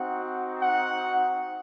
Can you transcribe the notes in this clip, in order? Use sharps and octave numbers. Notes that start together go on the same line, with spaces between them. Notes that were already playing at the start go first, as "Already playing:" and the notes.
Already playing: C4 D#4 F#4 F#5
F#5